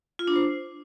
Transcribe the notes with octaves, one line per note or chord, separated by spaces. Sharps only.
F4
D4
C5